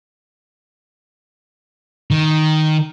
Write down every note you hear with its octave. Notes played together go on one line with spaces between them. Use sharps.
D#3